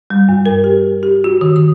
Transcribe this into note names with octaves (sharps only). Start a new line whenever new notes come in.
G3
G2
A#4
G4
G4
F#4
D#3
D#6